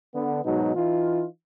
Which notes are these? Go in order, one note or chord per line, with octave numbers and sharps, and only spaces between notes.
D3 B3
G#2 B2 F#3 D#4
E3 D#4 F4